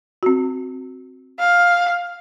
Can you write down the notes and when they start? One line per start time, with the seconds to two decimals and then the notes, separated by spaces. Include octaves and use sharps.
0.23 C4 F#4
1.39 F5